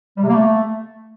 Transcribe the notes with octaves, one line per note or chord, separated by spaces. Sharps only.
G3
C3
A#3
A3